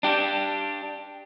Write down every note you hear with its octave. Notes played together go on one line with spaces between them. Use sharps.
D4 G4